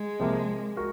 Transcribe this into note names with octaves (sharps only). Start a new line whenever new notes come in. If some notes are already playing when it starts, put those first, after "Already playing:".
Already playing: G#3
C3 F3 A#3
F#4 A#4